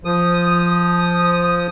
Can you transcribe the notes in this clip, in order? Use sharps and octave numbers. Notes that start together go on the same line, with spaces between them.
F3 D#6